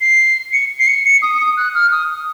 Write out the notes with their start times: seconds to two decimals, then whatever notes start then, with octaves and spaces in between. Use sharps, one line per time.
0.01 C7
0.53 C#7
0.80 C7
0.88 C#7
1.05 C#7
1.22 D#6
1.40 D#6
1.57 F#6
1.75 F6
1.92 D#6